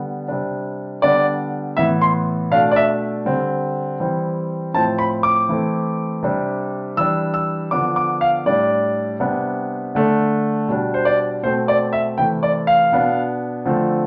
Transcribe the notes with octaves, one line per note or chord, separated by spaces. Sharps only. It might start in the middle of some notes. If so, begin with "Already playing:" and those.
Already playing: D3 G3 B3
C3 G3 D4
D3 G3 B3 D4 D5
A2 E3 B3 E5
C6
B2 A3 D4 F5
D5
E5
D3 G3 C4
E3 G3 C4
A2 F3 C4 A5
B5
D6
E3 A3 C4
C3 G3 D4
E3 G3 D4 E6
E6
D3 F3 B3 D4 D6
D6
F5
A2 G3 D4 D5
C3 G3 B3 D4
D3 A3 D4
B2 G3 D4
C5
D5
B2 A3 C4 C5
D5
E5
C3 E3 A3 G5
D5
F5
B2 B3 D4
D3 F3 A3 C4